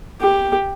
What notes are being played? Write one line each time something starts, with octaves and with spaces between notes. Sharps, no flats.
G4